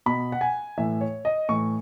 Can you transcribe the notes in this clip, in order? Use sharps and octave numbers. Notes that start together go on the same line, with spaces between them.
B2 B5
F#5
G#5
A2 E3 E5
C#5
D#5
A2 E3 C#6